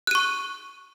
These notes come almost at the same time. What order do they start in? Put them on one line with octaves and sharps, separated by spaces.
F#6 D#7 C#6